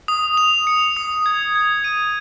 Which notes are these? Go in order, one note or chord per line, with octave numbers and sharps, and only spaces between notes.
D#6
F7
C#7
D#6
G#6
G#6
D#7